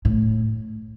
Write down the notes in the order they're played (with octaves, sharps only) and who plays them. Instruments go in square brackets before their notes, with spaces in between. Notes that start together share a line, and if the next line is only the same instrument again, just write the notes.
[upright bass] A2